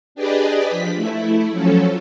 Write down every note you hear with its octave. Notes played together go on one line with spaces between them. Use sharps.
D4 G4 G#4 B4 D5 D#5
F3 B6
A3 E4
F3 F#3 C#4 A4